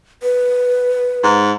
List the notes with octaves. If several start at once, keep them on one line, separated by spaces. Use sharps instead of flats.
B4
G#2